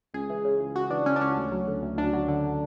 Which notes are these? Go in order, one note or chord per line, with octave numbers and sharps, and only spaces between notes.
C#2 G#4
E3
C#3
C#2
C#2 F#4
E3 D4
C#3 C#4
D4
C#2 C#4
D2
F#3
D3
D2
D2 D4
F#3
D3